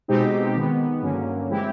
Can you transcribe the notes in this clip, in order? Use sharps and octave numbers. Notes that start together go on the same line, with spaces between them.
B2 G#3 C4 D#4 G4
D#3 G#3 B3
G2 D3 F#3 A#3 C#4
E3 G#3 C4 E4 G4